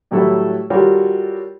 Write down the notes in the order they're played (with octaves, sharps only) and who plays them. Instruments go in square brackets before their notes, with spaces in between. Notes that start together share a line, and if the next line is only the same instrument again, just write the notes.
[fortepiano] A2 F#3 G3 A3 E4 A4
G3 F4 F#4 A4 A#4 C#5